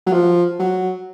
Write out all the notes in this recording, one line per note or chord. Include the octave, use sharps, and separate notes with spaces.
F#3
F3
F#3